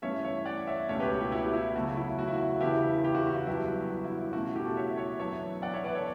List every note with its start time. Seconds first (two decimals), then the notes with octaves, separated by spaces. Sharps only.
0.02 G2 E3 A3 C#4 C#5 E5
0.25 C#5 E5
0.45 D5 F#5
0.67 C#5 E5
0.89 C#2 B2 A3 C#4 C#5 E5
1.00 G4 B4
1.10 F#4
1.21 E4 G4
1.31 E4 G4
1.53 E4
1.75 E2 C#3 F#3 A3 F#4
1.97 E4
2.19 F#4
2.27 E4
2.35 F#4
2.61 E2 C#3 E3 B3 D4 E4 G4
3.04 E4 G4
3.15 F#4
3.26 E4
3.36 F#4
3.47 F#2 E3 G3 B3 D4 E4 G4
3.68 F#4
3.90 F#4
4.04 E4
4.19 E4
4.33 B2 A3 C#4 F#4
4.44 F#4
4.55 E4 G4
4.65 F#4 A4
4.76 C#5 E5
4.98 C#5 E5
5.19 F#2 E3 B3 D4 C#5 E5
5.62 D5 F#5
5.74 C#5 E5
5.84 B4 D5
5.95 A4 C#5